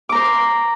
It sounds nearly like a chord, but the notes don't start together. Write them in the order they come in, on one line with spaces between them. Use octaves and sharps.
D6 A#5 C5